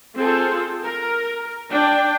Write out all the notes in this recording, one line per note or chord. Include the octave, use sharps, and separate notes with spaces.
C4 F4 G#4 A4 C5
A#4
D4 G5